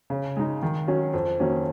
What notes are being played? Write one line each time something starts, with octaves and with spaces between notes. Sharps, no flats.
C#3
G#3 D#4
D#3
F#3 C#4
F2
D#3 F#3 A#3 C#4